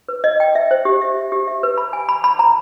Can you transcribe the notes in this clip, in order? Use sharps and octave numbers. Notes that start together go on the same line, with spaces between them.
B4
D#5
G5
E5
C5
G4
E5
E5
G4
E5
B4
B5
G#5
B5
B5
A#5